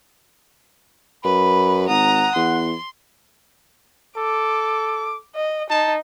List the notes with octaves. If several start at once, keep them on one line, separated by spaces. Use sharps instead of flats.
F#2 B4 B5
G#1 F#5 A#5 D#6
E2 C6
A4 D6
D#5
D#4 A5